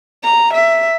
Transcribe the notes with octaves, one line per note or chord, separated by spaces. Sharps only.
A#5
E5